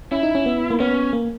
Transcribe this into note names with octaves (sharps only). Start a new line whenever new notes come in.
C#4 E4
D#4
C#4
B3
A#3
B3 C#4
A#3